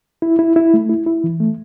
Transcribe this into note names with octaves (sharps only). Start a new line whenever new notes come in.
E4
E4
E4
A3
E4
E4
E3
A3